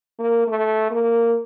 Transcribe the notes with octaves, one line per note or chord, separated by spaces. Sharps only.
A#3
A3
A#3